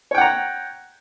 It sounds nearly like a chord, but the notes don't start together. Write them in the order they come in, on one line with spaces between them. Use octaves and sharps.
C#5 G5 F#5 A#5